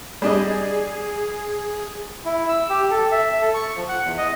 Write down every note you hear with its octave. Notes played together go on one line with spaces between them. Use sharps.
G3 D4 G#4 D#5
E4
E6
G4
A4
E5
A4
C#6
F3
F#5
E2
D#5